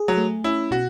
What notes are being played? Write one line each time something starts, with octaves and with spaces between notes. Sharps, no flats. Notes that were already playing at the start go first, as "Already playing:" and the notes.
Already playing: G#4
F#3
A3
C#4 E4
B2 F#4